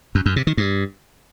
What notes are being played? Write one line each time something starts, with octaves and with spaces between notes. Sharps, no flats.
F#2
F#2
C3
D#3
G2